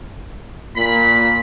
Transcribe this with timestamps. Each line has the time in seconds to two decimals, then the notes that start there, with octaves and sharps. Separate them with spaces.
0.76 A#2 B5